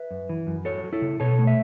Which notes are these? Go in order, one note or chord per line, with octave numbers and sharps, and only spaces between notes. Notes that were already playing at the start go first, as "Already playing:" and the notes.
Already playing: B4 E5
F#2
E3
F#2
F#3 A4 C#5
F#3
E4 A4
C#3
B2 A4 C#5
A3
E5